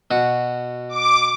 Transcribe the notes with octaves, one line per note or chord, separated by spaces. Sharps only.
B2 F#4
D6